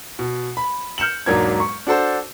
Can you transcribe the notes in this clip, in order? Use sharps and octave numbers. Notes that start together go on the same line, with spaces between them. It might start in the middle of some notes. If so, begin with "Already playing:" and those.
B2
B5
F6 G6 C#7 E7 F#7
E1 G#2 F#3 A#3 D4 G#6
C#6
D4 F#4 A4 C5